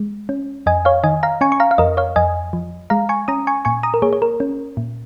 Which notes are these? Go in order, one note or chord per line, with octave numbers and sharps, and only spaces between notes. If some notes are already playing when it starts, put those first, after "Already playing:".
Already playing: G#3
C#4
F2 D#5 G#5
C#5 F5
D#3 D#5 G#5
F5 A#5
C#4 G#5 C#6
C#6
F5 A#5
F5
F2 A#4 D#5
C#5 F5
F2 D#5 G#5
F3
G#3 F5 A#5
G#5 C#6
C#4 A#5 D#6
G#5 C#6
A#2 G#5 C#6
A#5 D#6
A#4
A#3 G#4 C#5
C#5
A#4
C#4
A#2